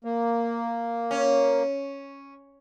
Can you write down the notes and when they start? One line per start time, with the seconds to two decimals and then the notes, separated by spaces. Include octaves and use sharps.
0.04 A#3
1.11 C#4